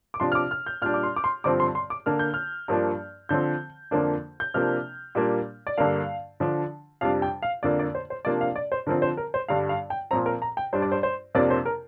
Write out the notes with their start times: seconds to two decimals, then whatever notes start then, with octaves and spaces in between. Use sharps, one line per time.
0.14 D6
0.20 C3 F3 D4 C6
0.32 F6
0.35 D6
0.51 F6
0.66 G6
0.82 A#2 G3 D4 F6
0.94 D6
1.03 C6
1.16 D6
1.24 C6
1.44 G2 D3 F3 C4 D6
1.60 C6
1.75 C6
1.90 D6
2.06 D3 A#3 D4 F6
2.19 G6
2.34 F6
2.68 G2 F3 A#3 D4
3.29 D3 F3 C4 G6
3.91 F2 D3 F3 A#3 D4
4.40 G6
4.54 C3 F3 A#3 D4 F6
5.15 A#2 G3 A#3 D4
5.67 D5
5.78 G2 D3 A#3 D4 F5
6.40 D3 F3 D4
7.01 F2 C3 G3 D4 F5
7.22 G5
7.42 F5
7.63 F2 D3 A#3 D4 D5
7.79 D5
7.95 C5
8.10 C5
8.25 C3 F3 A#3 D4 D5
8.41 F5
8.56 D5
8.72 C5
8.86 D3 F3 C4 A#4
9.02 C5
9.17 A#4
9.34 C5
9.48 G2 D3 G3 D4 F5
9.69 F5
9.90 G5
10.11 A#2 F3 C4 A#5
10.26 A#4
10.42 A#5
10.57 G5
10.73 G2 G3 D4 C5
10.82 D5
10.92 C5
11.03 C5
11.35 F2 C3 F3 A#3 D4 D5
11.50 C5
11.66 A#4